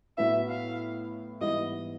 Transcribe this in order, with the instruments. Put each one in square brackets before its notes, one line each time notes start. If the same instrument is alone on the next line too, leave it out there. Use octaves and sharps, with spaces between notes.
[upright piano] A2 F#3 B3 E4 [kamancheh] E5
[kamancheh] F5
[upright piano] G#2 E3 G3 B3 E4 [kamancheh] D#5